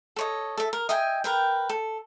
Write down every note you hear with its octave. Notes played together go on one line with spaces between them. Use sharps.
A4 C#5 D#5
A4 E5
A#4
D#5 E5 G5 G#5
A#4 B4 G5
A4